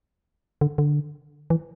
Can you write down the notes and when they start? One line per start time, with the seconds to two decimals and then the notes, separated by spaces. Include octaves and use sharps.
0.61 D3
0.78 D3
1.50 E3